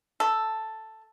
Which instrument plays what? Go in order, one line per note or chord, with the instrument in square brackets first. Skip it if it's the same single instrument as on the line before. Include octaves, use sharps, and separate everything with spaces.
[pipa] A4